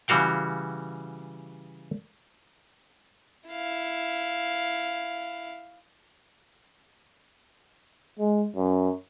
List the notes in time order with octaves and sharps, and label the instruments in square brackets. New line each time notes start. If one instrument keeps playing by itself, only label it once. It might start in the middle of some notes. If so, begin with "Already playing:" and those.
[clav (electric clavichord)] C#3 E3 G3 F#4 F5 G5
[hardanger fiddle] E4 F5
[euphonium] G#3
F#2